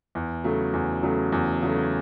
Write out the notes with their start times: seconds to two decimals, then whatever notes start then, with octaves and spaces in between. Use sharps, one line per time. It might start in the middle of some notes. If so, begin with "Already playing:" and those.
0.15 E2
0.44 C#3 F#3 A3
0.73 E2
1.03 C#3 F#3 A3
1.32 E2
1.62 C#3 F#3 A3